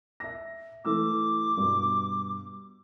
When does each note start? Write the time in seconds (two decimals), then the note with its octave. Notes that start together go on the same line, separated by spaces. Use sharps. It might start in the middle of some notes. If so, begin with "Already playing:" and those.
0.20 E5 A#6
0.85 E3 A3 D6 E6
1.57 G2 B2